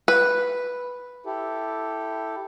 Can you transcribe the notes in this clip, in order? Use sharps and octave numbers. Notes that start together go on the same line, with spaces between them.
B4
E4 G4 A4